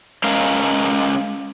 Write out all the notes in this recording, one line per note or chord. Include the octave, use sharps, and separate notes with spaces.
G#3 C#4 A#4 F5